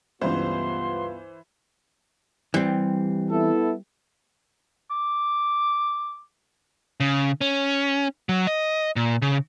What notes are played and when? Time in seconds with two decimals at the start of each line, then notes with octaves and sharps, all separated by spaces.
0.21 C#2 G2 E3 B3 F4 C5 C6
2.54 E3 G3 C4
3.31 B3 E4 A4
4.91 D6
7.00 C#3
7.41 C#4
8.29 F#3
8.47 D#5
8.96 A#2
9.22 C#3